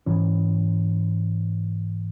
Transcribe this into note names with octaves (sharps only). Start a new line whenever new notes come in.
G#2 E3 C#4